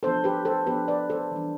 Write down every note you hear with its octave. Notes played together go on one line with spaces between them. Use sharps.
F3 B3 D4 A4 C5
G4 B4
A4 C5
F3 B3 D4 G4 B4
B4 D5
A4 C5
E3 G3 D4